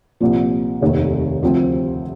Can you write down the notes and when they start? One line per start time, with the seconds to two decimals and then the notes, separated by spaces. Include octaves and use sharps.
0.20 C2 A#2 F3
0.81 F1 D#2 D#3 A3
1.43 D2 C3 F3 C4